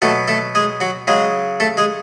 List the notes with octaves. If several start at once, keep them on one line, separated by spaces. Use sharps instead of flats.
B2 F#3 A3 A4
A3 A4
G#3 G#4
F#3 F#4
C#3 F#3 G#3 G#4
A3 A4
G#3 G#4